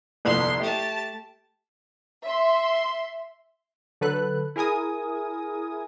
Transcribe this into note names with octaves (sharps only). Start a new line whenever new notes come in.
G1 C2 F2 C6
A3 G4 A5
E5 C6
D3 F#3 A4 B4 F#6
E4 G#4 A#4 G#5 D#6